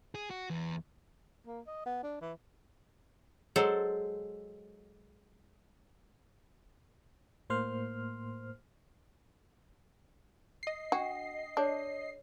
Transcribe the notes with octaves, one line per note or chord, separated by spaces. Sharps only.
G#4
F#4
E2
A#3
D#5
B3
D4
E3
F#3 G#3 A4 C5
A2 A#3 C5 C6 F6
D#5 C7
D4 F#4 G5
D4 G#4 C#5